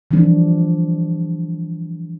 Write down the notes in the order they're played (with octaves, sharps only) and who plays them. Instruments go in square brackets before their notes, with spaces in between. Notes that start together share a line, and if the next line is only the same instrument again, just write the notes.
[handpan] E3 F3 G3 D4